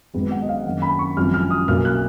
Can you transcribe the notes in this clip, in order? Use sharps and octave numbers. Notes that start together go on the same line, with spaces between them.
G#1 G#2 F#3 B3 B4
F#5
D#5
F5
F#2 D#3 A#3 F#5
B5
C#6
G#1 F#2 F3 F6
F6
D#6
B1 B2 A#3 F6
F#6